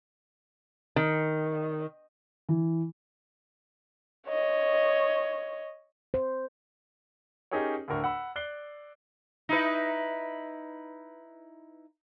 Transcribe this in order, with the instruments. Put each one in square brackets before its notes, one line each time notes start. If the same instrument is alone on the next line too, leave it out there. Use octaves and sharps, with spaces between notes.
[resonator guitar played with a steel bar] D#3
[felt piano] E3
[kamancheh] C#5 D#5
[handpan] C5
[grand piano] C#4 D#4 G4 G#4 A#4 C#5
D2 A2 D3 A#4 C#6
F#5 B5 E6
D5 F#6 C7 G7
[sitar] D#4 E4 B4